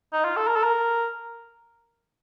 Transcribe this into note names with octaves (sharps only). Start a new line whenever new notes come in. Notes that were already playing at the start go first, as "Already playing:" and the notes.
D#4
F4
A4
A#4
A4
A#4